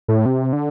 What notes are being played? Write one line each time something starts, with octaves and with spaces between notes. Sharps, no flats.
A2
C3
D3